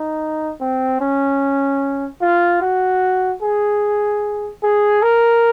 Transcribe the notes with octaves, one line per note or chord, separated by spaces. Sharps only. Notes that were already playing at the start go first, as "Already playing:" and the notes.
Already playing: D#4
C4
C#4
F4
F#4
G#4
G#4
A#4